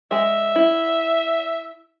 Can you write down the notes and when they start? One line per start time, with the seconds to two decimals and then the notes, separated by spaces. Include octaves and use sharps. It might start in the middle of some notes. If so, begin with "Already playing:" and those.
0.11 G#3 E5 G#5
0.56 E4